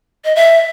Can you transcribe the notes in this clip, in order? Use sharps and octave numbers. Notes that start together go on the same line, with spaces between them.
D#5
E5